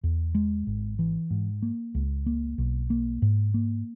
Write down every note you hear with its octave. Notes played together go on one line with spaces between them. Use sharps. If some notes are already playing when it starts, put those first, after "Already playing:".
E2
G#3
G#1
E3
G#2
A#3
C#2
A#3
B1
A#3
G#2
A#3